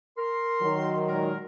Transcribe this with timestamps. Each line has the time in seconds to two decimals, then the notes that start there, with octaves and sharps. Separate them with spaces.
0.18 A#4 C6
0.61 D#3 F#3
1.07 A#2 G#3 A#4